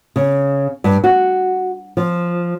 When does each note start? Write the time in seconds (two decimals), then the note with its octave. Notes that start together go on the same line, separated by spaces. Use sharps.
0.16 C#3
0.84 G2
1.04 F#4
1.97 F3